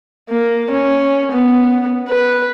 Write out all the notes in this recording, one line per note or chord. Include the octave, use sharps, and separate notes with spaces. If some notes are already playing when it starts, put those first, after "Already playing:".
A#3
C#4
B3
B4